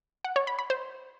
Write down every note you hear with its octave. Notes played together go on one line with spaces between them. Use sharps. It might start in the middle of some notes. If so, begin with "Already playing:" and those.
F#5
C#5
B5
B5
C5